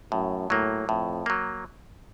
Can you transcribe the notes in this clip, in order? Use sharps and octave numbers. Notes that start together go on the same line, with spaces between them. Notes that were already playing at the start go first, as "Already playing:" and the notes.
F#2 A2
A2 F#3 A#3
F2 A2
F#3 A#3